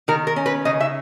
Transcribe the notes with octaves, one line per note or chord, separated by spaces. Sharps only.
D#3 A#4
A#4
C#4
B4
C#3 D#5
E5